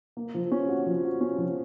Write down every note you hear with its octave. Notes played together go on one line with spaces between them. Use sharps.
A#3
F3
C#4
F#4
F3
F#4
C#4
F3